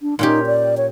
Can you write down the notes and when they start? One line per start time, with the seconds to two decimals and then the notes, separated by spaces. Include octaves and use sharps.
0.02 D4
0.19 A#2 C#4 D#4 G4
0.47 D5
0.77 C#5